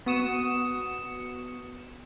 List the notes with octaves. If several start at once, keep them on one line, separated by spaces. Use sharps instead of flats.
B3 F#4 D#6 C#7 E7